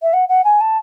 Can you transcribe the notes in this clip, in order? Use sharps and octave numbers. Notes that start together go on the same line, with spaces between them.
E5
F#5
F#5
G#5
A5